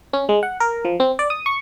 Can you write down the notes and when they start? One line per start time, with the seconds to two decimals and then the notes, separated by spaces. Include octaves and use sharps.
0.13 C#4
0.29 G#3
0.43 F#5
0.60 A#4
0.85 F3
1.00 C4
1.19 D5
1.30 D#6
1.46 C#6